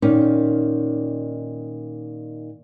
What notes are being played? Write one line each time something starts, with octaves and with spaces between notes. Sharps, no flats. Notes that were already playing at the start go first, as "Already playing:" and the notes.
A#2 D#3 C#4 D#4